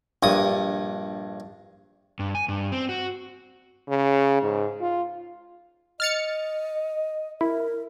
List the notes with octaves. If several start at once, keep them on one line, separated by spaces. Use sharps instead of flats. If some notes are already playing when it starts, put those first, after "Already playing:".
A#1 G2 D#6
G2
G#5
G2
C4
F#4
C#3
G#2
F4
D#5 F6 A6 C#7
E4 A#4